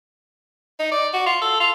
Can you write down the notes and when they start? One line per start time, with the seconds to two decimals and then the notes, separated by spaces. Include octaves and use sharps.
0.79 D#4
0.91 D5
1.13 F#4
1.26 F4
1.41 A4
1.60 F4